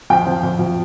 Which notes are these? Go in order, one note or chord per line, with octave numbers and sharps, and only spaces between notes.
F2 G5
F3
F2
F2